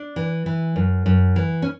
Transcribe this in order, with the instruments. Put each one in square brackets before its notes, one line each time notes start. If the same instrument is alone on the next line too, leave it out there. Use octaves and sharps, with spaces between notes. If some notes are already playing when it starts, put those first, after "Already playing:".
Already playing: [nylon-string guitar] D4
E3
E3
F#2
F#2
E3
C#4